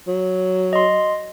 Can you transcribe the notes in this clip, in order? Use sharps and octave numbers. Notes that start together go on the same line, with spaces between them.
F#3
D#5 C6